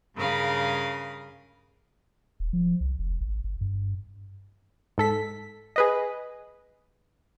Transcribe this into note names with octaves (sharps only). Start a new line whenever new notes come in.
G2 C#3 A#4 F5 B5 D#6
D#1
F3
C2
F1
G#1
G1
G2
G#2 A4 B6
G#4 B4 D#5